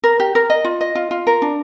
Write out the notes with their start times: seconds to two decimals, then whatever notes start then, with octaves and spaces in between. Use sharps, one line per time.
0.04 A#4
0.20 G4
0.35 A#4
0.50 D#5
0.65 F4
0.81 D#5
0.95 F4
1.11 F4
1.27 A#4
1.42 D4